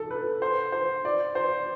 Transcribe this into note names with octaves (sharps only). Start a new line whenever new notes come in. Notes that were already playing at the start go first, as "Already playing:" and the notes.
Already playing: A4
B4
C5
C5
D5
C5